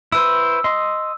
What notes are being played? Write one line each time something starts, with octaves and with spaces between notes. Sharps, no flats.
E4 B4 C5 E6
D#5 C6